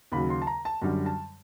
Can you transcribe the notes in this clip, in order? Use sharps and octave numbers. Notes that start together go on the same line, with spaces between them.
D#2 C#3 F#3 B5
C6
A5
A#5
A5
F#2 D3 G3
A5